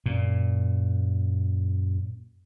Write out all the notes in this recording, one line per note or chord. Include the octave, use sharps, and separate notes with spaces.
F#2 A#2